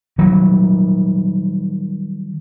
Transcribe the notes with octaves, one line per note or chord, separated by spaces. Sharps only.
D#3 F#3 G3